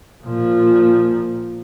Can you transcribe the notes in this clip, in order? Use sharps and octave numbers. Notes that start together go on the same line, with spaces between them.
A#2 F3